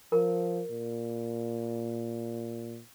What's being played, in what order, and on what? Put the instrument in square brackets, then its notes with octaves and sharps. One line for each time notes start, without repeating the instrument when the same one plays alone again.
[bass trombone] F3 [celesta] A#4
[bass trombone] A#2